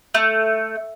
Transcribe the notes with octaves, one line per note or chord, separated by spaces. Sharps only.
A3